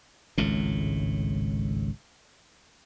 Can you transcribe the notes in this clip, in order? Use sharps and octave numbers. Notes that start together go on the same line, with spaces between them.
G#1 C#2 A2